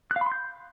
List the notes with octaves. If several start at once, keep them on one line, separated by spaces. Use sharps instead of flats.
F#6
F5
B5
C6
G6